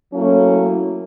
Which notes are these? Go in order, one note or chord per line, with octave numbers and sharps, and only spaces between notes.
F#3 A3 A#3 C#4 E4